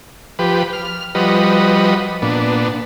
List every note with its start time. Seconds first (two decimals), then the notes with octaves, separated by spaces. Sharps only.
0.39 F3 G4 B4
0.73 F6
1.15 F3 G3 F#4 B4 D#5
2.22 A#2 B3 D4